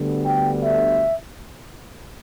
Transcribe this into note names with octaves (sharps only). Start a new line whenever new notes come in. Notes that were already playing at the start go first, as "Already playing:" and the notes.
Already playing: D2 D3 G3 B3
G5
E5